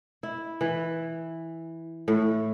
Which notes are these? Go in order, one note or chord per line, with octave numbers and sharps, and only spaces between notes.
E4
E3
A2